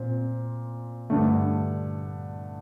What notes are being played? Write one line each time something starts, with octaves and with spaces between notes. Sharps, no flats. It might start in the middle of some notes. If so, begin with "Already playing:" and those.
Already playing: A#2 C4
G2 D3 A3